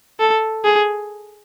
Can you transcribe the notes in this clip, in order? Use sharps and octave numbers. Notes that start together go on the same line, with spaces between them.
A4
G#4